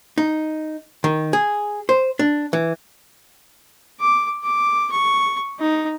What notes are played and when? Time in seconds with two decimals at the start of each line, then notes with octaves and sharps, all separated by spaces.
0.18 D#4
1.04 D#3
1.33 G#4
1.89 C5
2.19 D4
2.53 E3
4.00 D6
4.43 D6
4.91 C#6
5.60 D#4